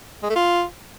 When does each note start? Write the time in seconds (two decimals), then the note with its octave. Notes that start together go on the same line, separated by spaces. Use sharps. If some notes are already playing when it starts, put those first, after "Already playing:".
0.23 G#3
0.29 A3
0.35 F4